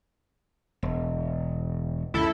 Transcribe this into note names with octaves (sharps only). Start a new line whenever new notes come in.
E1
C#2 F#2 E4 A4